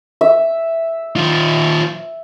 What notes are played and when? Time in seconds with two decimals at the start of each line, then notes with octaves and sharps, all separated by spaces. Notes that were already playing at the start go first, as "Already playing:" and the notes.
0.21 E5
1.16 D#3 F4